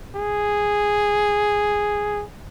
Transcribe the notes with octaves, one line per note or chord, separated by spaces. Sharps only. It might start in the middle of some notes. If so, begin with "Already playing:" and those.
G#4